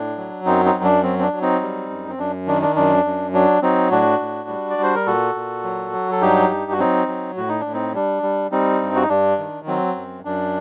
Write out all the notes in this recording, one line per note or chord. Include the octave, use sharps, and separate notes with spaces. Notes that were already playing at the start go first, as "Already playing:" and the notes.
Already playing: A2 D4
F#3
F#2 C4 D#4
C4 D#4
F#2
D4
F#3 C4
C4
D4
F#3
C4 D#4
G3
F#2
C4
F#2 D4
D#3 D4
D4
F#2 D4
F#2
F#3 D4
F#3 C4 D#4
A2 D4 F#4
A2
G3
D5
G3
C5
A#4
A#2 F#4 A4
A#2
F#3
F#3
A4
G2 D#4 G4
G2
F#4
F#3 C4 D#4
F#3
A2 F#4
D#4
D4
A2
C4 D#4
G3 D4
G3
G3 C4 D#4
G2
F#4
D#4
G2 D4
D#3
F#3 C4
F#2
F#2 D4